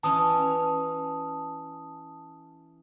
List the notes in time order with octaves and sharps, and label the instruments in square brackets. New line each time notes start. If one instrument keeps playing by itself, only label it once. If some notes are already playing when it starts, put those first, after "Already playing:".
[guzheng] E3 C#4 [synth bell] A5 D#6